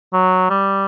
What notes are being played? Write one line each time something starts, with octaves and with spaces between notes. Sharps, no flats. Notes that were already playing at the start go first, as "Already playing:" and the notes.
F#3
G3